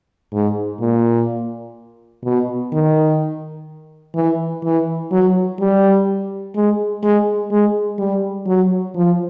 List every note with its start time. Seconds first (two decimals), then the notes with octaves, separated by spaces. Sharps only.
0.33 G#2
0.81 A#2
2.24 B2
2.73 D#3
4.15 E3
4.64 E3
5.12 F#3
5.60 G3
6.56 G#3
7.03 G#3
7.51 G#3
7.99 G3
8.47 F#3
8.95 F3